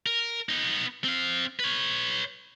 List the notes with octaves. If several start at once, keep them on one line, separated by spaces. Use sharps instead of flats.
A#4
B3 D#4
C4 F5
B4 C#5